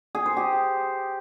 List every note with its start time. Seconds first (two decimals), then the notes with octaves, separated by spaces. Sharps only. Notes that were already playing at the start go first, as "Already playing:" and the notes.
0.15 G#4
0.26 C5
0.37 G4